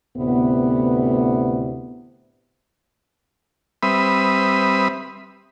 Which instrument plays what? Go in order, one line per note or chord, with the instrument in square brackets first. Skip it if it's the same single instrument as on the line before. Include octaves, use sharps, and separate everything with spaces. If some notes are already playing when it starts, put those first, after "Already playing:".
[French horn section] D2 A2 C3 B3
[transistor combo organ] G3 C4 B4 E5 B5 D#6